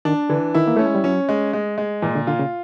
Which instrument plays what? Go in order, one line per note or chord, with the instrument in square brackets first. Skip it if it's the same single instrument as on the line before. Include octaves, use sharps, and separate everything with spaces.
[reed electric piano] D#3 [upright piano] D4
[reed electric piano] D3 [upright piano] E3
[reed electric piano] D#3 [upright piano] E4
[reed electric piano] A#3
[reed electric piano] A3 [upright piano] C#4
[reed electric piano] G#3
G3
[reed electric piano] F#3 [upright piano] C#4
[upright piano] G#3
G#3
G#3
[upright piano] A#2 [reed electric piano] E3
[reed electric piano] D3
[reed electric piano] D3 [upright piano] F4
[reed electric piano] C#3